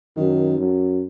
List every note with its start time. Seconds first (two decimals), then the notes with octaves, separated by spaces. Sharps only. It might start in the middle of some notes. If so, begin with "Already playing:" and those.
0.16 F#2 D#3
0.58 F#2